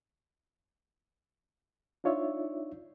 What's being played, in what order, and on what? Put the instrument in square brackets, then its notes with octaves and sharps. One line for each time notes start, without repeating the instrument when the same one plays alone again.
[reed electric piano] D4 D#4 F4 C#5 D5 E5